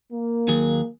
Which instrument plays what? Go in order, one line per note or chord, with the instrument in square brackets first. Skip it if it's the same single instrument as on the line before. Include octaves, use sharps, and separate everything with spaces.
[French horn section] A#3
[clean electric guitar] D#2 F#3 G#4